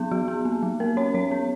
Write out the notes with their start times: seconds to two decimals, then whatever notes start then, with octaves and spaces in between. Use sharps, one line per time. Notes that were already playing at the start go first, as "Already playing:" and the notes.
Already playing: F#3 B3 G#4
0.11 F#3 F#4
0.28 B3
0.45 A#3
0.63 F#3
0.80 A#3 A#4
0.97 C#4 C#5
1.14 F#3 C#5
1.31 B3